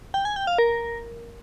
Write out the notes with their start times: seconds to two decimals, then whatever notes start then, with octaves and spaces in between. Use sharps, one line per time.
0.14 G5
0.25 G#5
0.36 G5
0.47 F5
0.58 A#4